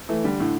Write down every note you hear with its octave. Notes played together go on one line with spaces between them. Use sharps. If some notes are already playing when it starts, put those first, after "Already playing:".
E3 A3
D3 G3
A2 D3